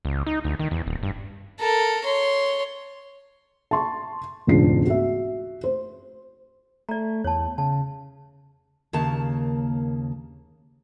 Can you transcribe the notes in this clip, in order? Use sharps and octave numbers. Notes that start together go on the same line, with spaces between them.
C#2
D#4
D2
D#3
E2
D#1
G2
A4 A#4
C#5 C6
A5 C6 C#6
E1 C#2 G#2 D4 F4 C7
F#4 E5
C5
A3 D5 A#5
E2 C#5 A5
C#3 A5
D#2 C#3 A#3 A5